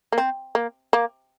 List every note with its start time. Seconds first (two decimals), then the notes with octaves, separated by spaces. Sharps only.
0.12 A#3
0.18 C4
0.55 A#3
0.93 A#3